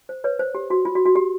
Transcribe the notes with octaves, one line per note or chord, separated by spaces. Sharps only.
C5
B4 C#5
C5
G4
F#4
F4
F#4
F#4
G4